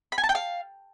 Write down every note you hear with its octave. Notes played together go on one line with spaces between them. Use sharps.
B5
G#5
A5
G5
F5